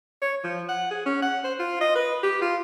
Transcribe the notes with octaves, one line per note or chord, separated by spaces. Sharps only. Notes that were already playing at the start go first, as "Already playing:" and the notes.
C#5
F3
F#5
G#4
C#4
F#5
C5
F4
D#5
B4
G4
F4